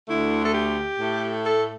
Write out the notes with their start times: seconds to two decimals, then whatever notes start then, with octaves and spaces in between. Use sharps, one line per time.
0.09 D2 D3 A3 E4
0.45 A4
0.54 G4
1.00 A2 A3
1.45 A4